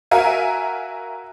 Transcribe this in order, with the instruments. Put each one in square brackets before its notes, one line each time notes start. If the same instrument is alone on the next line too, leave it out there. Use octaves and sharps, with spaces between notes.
[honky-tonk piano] F#4 A#4 E5 F5 G#5